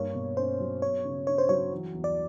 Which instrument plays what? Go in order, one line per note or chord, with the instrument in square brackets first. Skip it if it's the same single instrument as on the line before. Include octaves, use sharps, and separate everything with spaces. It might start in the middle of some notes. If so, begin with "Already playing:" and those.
Already playing: [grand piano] G2 A#3 [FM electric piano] C#5
[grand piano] B2
[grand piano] C#4 [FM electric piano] C5
[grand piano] F#3
[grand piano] B3 [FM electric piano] C#5
[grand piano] C#3
[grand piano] D4 [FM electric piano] C#5
[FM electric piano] C5
[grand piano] F#3 [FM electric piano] C#5
[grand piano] E3
E2
[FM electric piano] D5